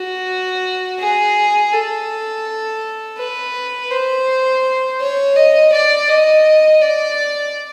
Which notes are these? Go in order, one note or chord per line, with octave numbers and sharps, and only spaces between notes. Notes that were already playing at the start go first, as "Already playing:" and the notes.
Already playing: F#4
G#4
A4
B4
C5
C#5
D#5
D5
D#5
D5